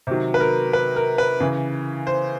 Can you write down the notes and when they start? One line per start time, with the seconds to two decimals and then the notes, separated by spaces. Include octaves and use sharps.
0.07 C3 D#3 F#3
0.34 B4
0.40 A#4
0.73 B4
0.96 A#4
1.18 B4
1.40 C#3 E3
2.07 C5